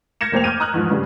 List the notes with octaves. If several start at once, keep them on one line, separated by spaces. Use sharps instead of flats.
F6 G6 G#6 A#6 C#7 E7
F1 A#3 C5 G5 F7
D6 F6 G6 G#6 D#7
A#5 D#6 F6 F#6 G#6
E2 G#2 F3
G2 C#3 D4 G4